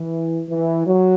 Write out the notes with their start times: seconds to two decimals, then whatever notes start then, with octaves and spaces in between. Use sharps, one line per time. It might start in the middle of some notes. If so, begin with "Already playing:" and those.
Already playing: E3
0.49 E3
0.87 F#3